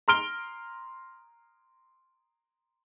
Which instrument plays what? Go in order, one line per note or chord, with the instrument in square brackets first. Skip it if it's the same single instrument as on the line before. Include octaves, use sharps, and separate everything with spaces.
[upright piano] A#5 C6 F6 D7 G7